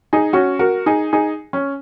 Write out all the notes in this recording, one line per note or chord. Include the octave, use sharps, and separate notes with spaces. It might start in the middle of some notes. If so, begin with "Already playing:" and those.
D#4 G#4
C#4 F#4
F#4 A#4
D#4 G#4
D#4 G#4
C#4